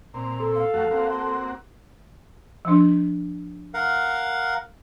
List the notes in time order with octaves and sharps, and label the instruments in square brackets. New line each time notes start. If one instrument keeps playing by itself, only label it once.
[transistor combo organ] A#2 C4 [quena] A#5
[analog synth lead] A4
[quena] F5
[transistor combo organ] F#2 A3 F#4
A#3 C4 F#4
[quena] C6
[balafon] F3 D4
[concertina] A#4 F5 F#5